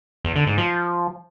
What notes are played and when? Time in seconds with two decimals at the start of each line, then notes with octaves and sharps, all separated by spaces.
0.25 E2
0.36 D3
0.47 G#2
0.58 F3